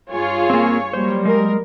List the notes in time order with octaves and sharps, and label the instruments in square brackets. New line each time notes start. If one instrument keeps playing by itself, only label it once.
[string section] G2 F4 G#4 [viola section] C#5
[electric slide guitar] A#3 C4
[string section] F#3 G3 A#3 [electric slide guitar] C5
[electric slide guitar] G#3 [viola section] A#4